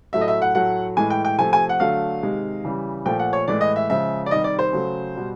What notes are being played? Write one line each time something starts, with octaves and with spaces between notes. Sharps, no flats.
A2 F#3 A3 E5
D#5
E5
F#5
A2 F#3 A3 F#5
A2 E3 G#3 G#5
G5
G5
C3 F3 A3 G#5
G#5
F#5
D3 F#3 A3 F5
C3 D#3 G#3
C#3 E3 G3
A#2 F3 A3 G5
F#5
C#5
A2 E3 G#3 D5
D#5
E5
C#3 F3 G#3 E5
D5
C3 D#3 G3 D#5
D5
C5
C#3 F#3 A3
B2 G3